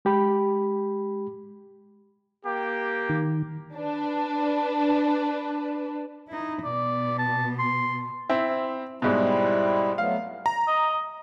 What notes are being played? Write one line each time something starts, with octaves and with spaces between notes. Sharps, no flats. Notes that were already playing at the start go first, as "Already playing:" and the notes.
G#3 G4 B5
A#3 G4
D#3
D4 B4
D#4 E4
B2 B3 D5
A5
C6
C4 E4
G#2 B2 G3 C4 E4
F#3 A3 B3 F5
A#5
D#5